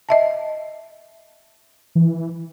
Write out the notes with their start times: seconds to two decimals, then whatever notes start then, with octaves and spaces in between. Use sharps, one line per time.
0.09 D#5 E5 A5
1.95 E3